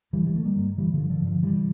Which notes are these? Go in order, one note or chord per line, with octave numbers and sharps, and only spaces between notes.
D3 E3 G3
G3
D3 A3
G3 A#3
G2
D3 E3 G3
D3 F3
G2
D3 F3
G2
D3 F3
C3 E3 G3